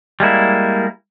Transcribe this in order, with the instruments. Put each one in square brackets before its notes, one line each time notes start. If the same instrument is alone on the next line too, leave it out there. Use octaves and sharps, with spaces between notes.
[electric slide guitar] G3 G#3 A#3 E4